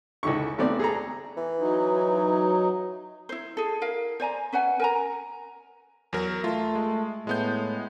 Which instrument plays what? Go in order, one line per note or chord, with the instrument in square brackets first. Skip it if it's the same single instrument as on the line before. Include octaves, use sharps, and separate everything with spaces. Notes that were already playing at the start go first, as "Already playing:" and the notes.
[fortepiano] C#2 G#2 D3 E4 C#6
G#1 A3 B3 C4 D5
G#4 A4 A#5
[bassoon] E3
[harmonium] F#3 D#4
[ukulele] E4 C5
G#4 A4
E4 A#4 F5
C5 D5 G#5 A#5
C#4 B4 F#5 G#5
A#4 G#5 A#5
[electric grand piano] E2 F#3 A#4
[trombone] A3 [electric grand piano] F4
[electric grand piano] G#3
[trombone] A2 [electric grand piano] G#3 B3 G6